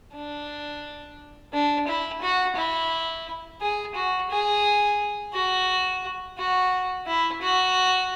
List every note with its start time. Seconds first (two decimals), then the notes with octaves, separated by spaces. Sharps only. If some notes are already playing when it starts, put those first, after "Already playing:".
0.15 D4
1.54 D4
1.88 E4
2.22 F#4
2.56 E4
3.61 G#4
3.95 F#4
4.31 G#4
5.34 F#4
6.38 F#4
7.07 E4
7.41 F#4